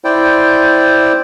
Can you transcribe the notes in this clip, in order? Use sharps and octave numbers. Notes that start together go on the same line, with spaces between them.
E4 C5 D5 G5